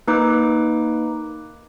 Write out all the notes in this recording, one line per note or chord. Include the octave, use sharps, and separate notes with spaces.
A#3 D#4 B4 D6